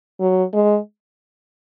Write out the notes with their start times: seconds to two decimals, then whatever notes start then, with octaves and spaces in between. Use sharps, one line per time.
0.20 F#3
0.54 G#3